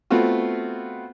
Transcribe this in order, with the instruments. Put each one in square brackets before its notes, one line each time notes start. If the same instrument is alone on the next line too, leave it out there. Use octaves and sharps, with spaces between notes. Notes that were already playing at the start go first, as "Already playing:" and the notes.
[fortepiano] A3 B3 C4 F4 F#4